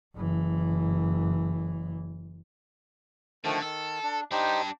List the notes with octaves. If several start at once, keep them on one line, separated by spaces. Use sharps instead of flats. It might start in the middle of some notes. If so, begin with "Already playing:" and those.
F#1 E3
D3 D#3 F3 A3
D#3 A4
D4
G3 D4 D#4 G4 C5